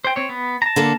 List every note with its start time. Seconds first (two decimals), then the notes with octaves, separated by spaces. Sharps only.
0.05 C5 G5
0.16 C4 C#5
0.29 B3
0.62 A5 A#5
0.76 D3 A#3 A4